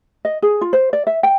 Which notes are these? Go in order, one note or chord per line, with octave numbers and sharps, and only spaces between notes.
D#5
G#4
F4
C5
D5
E5
G5